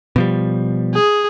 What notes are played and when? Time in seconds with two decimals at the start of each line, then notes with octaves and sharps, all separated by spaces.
0.16 B2 F3 G3
0.94 G#4